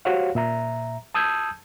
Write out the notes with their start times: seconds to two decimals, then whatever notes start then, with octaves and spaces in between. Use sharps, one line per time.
0.05 F#4 G4 C5 C#5 F5 F#5
0.35 A#2 E5 A#5
1.14 A5 D#6 E6 G6 G#6